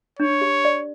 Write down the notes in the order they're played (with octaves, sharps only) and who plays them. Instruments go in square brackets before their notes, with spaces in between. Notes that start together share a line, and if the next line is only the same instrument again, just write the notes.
[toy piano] D4 [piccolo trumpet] C#5
[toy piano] G4
D5